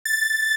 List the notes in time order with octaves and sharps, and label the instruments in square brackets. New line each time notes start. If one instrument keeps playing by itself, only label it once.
[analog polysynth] A6